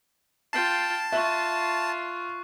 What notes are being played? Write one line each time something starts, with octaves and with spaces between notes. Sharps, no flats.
F4 G5 A5 C7
F4 E5 C#6 F#6